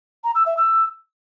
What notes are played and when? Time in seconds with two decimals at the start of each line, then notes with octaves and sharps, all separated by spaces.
0.24 A#5
0.35 E6
0.46 E5
0.57 E6